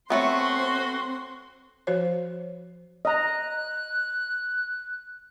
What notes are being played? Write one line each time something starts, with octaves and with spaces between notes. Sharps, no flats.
F#3 A3 B3 C4 F#4 C6
F3 F#4 C5 C#5
D#5 A#5 F#6